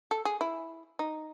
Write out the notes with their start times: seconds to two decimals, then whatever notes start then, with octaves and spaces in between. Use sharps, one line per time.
0.11 A4
0.25 G#4
0.41 E4
0.99 D#4